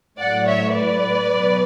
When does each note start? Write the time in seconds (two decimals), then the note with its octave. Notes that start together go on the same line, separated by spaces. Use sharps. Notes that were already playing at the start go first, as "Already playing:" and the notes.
0.19 A2 F#3 D5 F#5
0.47 C#5 E5
0.75 B4 D5
1.32 B2 F#3